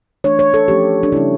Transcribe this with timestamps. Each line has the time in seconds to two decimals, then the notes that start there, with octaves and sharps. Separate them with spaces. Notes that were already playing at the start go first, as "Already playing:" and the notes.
0.24 E3 A3 D4 C#5
0.39 C#5
0.54 A4
0.68 F3 A3 C#4 G4
1.03 D4
1.12 C#3 G3 C#4 E4